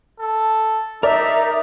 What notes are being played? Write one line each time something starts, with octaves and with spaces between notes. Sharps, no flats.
A4
D#4 A#4 D5 E5